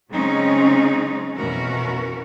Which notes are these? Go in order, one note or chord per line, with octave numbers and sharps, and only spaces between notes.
C#3 F#3 G#3 C4 C#4 D#4
F2 B2 E3 C#4 F#4 A#4